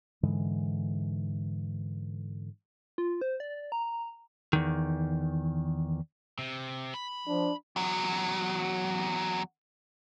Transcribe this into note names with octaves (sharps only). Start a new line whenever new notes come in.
G#2 D3 E3 G#3
F4
C5
D5
A#5
E2 D#3
C3
B5
F3 D4
E2 F#3